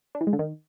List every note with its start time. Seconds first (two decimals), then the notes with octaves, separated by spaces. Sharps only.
0.15 D4
0.21 E3
0.27 G#3
0.33 D3
0.39 D#3